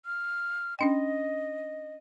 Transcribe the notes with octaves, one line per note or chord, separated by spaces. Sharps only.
F6
C#4 D4 D#5 G5